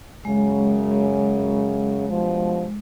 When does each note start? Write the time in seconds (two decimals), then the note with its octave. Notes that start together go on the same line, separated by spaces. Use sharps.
0.25 F#2 C#3 G#3
2.09 G2 B2 F3